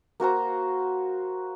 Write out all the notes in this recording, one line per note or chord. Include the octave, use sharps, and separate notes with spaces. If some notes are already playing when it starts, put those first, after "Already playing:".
A#3 F#4 C5 A#5